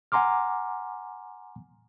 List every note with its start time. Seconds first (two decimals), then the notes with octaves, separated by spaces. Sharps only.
0.12 F#5 G#5 A#5 C6 D6 F6